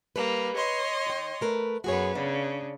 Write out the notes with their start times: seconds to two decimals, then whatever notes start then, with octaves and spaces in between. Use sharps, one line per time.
0.16 G3 A#3 B4
0.55 C#5 D#5 C6
1.06 D#3 G5
1.41 A3 A#4 B4
1.84 F#2 B3 F#4 G#4 C#5
2.15 C#3 D4